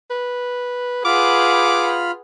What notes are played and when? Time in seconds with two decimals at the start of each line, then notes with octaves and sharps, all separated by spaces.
0.10 B4
1.05 F4 G#4 B4 F#5 B5 D6 F6